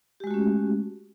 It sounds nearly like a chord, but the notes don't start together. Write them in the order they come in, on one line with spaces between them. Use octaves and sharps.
G4 G#3 F#4 A3 C#4